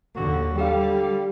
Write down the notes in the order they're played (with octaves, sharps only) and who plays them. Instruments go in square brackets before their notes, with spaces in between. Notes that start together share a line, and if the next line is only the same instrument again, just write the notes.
[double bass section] D#2 D3 [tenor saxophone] F#4
[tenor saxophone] D3 [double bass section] G3 [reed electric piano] G4 F5